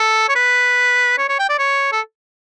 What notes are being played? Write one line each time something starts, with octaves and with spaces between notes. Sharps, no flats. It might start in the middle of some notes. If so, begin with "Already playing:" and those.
Already playing: A4
C#5
B4
C#5
C#5
G5
D5
C#5
A4